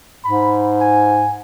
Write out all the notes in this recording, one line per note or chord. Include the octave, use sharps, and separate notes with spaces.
G#2 B5
G#5